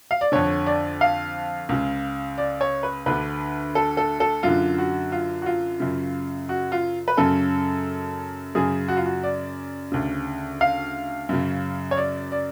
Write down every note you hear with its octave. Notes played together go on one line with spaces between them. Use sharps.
F5
D5
F2 D3 C#5
D5
F5
C#2 C#3
D5
C#5
B4
D2 D3 B4
A4
A4
A4
F#2 D3 F4
F#4
F4
F#4
F4
F#2 C#3
F#4
F4
B4
F#2 C#3 A4
F#2 C#3 G#4
F#4
F4
F#4
D5
D2 C#3
F5
F#2 C#3
C#5
D5
D5